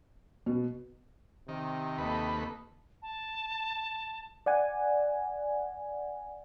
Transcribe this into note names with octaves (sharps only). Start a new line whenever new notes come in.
B2
C3 D#3
D#2 A#3 A4 B4 D#5
A5
D5 F#5 G#5